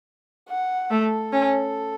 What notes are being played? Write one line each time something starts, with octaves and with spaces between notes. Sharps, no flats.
F#5
A3 A4
C#4